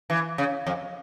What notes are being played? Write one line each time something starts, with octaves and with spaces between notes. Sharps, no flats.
E3
C#3
F2